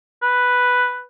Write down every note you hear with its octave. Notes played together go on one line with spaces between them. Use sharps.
B4